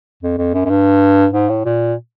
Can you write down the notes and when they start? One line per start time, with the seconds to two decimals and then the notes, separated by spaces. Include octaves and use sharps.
0.23 F2
0.38 F2
0.54 F#2
0.65 F#2
0.70 G2
1.33 G#2
1.49 A2
1.65 A#2